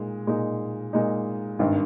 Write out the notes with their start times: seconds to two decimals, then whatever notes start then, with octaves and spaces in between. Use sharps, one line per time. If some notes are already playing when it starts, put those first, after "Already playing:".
Already playing: A#2 G#3 D#4
0.27 A#2 G#3 D#4
0.93 A#2 G#3 D#4
1.59 G#1 G2 D#3